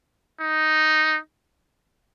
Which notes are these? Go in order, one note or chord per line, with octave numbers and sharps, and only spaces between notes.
D#4